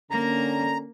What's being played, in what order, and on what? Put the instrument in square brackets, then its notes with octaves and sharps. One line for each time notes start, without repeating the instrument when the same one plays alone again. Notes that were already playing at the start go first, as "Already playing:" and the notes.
[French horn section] D3 C#4 [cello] A#3 [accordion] A#5